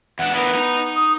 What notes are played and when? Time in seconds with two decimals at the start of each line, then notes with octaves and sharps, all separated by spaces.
0.19 E2 D4 F#5
0.35 E3 B3 A#4
0.55 D#4 A#5
0.96 D#6